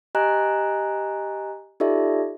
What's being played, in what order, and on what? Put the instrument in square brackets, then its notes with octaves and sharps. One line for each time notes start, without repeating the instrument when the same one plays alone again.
[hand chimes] G4 D#5 G#5 A#5 F#6
D#4 F4 G4 A4 D5 E5